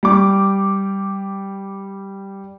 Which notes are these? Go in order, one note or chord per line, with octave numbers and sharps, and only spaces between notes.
G3 D6